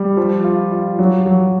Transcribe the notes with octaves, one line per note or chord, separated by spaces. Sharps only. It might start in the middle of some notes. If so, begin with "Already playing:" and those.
Already playing: G3
F3
F4
F4
F#3
F#3